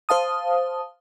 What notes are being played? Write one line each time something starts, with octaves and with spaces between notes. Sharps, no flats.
C5 F5 A5 D#6